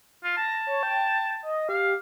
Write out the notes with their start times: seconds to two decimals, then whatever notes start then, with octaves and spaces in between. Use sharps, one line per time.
0.24 F4
0.37 A5 A#6
0.67 C#5
0.83 G5
1.43 D#5
1.69 G4 F5